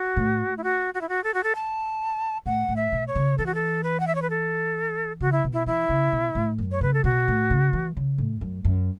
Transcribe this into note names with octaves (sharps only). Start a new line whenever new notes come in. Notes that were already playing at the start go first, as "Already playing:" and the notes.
Already playing: F#4
A2
E4
F#4
F#4
E4
F#4
A4
F#4
A4
A5
A2 F#5
A2
E5
B2
C#5
C#3
E3 A4
F#4
A4
B4
F#5
E5
C#5
B4
A4
C#3 F#4
E4
B2
E4
E3 E4
C#3
B2
A2
F#2
C#5
C#3 B4
A4
B2 F#4
A2
C#3
E3
C#3
A2
F#2
F#2